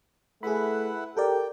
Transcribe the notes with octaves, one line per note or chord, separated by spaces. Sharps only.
A3 E4 G#4 B4 F#5 B5
G4 A4 A#4 D5 G5